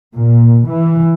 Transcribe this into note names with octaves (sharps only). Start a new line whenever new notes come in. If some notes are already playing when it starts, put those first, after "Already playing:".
A#2
E3